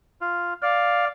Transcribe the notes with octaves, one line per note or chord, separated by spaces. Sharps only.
F4
D5 F5